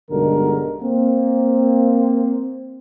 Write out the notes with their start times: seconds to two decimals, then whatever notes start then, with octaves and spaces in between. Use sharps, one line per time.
0.11 B1 G2 D3 G#3 A#4
0.82 A#3 C4